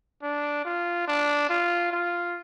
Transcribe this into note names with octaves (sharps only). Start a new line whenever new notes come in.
D4
F4
D4
F4
F4